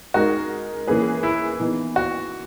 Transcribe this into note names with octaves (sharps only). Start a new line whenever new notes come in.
G#3 D#4 F#4 A#4
E3 A#3 C#4 G#4 B4
E4
E3 B3 D#4
F#4